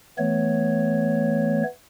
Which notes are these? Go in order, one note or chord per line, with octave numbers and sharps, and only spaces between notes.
E3 A3 B3 C#5